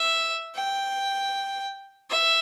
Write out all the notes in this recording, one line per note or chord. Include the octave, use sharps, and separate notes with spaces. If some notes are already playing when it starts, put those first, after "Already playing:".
Already playing: E5
G5
E5